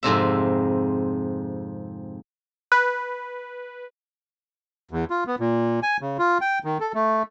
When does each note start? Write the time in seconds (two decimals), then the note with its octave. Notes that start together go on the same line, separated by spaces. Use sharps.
0.03 F2 G#2 C3 E5
2.72 B4
4.91 E2
5.10 F4
5.27 B3
5.39 A#2
5.83 G#5
6.01 C#3
6.19 F4
6.41 G5
6.64 D#3
6.80 A4
6.94 A3